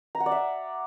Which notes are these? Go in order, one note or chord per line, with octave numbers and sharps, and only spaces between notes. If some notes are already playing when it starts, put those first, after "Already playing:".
A#5
F#5
D5
E5